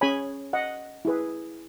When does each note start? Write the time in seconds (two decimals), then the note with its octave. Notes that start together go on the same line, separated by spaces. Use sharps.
0.01 C#4 G#4 C#5 G#5 B5
0.53 D#5 F#5
1.05 E4 G#4 B4